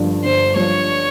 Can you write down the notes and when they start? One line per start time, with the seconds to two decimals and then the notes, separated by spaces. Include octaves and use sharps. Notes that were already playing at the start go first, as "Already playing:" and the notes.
Already playing: G1 G2 F3
0.23 G1 C5
0.56 G2 F3 C#5